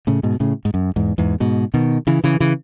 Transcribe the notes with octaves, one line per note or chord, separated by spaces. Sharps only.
A2 C#3
G#2 B2
A2 C#3
G#2
F#2
E2 G#2
E2 G#2
G#2 B2
B2 D#3
C#3 E3
C#3 E3
C#3 E3